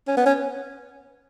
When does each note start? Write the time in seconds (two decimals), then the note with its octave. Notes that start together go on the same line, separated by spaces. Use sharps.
0.07 C#4
0.17 B3
0.26 C#4